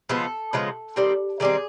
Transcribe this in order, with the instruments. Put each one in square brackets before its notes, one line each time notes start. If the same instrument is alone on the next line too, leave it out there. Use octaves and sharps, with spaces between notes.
[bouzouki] C#3 F3 G#3 B3 A4
C#3 F3 G#3 B3
D#3 G3 C4
D#3 G3 C4 G#4